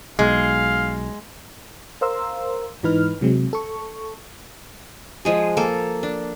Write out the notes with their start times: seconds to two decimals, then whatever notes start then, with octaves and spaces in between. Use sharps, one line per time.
0.19 B1 G#3 F5
2.01 A#4 C5 F5 A#5 C6 E6
2.83 G#2 E3 D#4 B4 F6
3.21 C3 F#3 G#3 C4
3.53 A4 C#6
5.25 F3 G#3 G#4
5.57 A#3 A4
6.03 D4